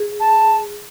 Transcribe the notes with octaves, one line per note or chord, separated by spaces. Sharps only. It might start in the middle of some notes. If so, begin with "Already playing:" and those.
Already playing: G#4
A5